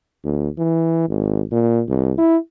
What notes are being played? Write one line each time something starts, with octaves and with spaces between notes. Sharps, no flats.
D2
E3
G#1
A#2
C2
E4